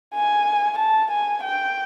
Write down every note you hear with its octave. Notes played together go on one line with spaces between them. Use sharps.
G#5
A5
G#5
G5